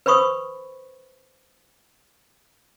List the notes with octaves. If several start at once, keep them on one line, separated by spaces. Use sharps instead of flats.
B4 C5 B5 C#6 D#6